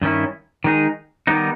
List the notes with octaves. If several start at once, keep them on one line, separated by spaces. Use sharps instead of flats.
G2 D#3 A#3 C#4 E4
D#3 G#3 D#4 G#4
D#3 G3 B3 D#4